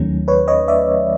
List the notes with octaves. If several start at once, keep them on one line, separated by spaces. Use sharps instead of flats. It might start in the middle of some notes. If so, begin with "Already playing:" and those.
Already playing: D#2 D#3 F#3 A3 C#4
B4 C#5
C#5 D#5
D5 E5